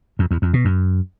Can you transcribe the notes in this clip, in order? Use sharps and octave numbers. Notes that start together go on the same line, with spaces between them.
F2
E2
F2
B2
F#2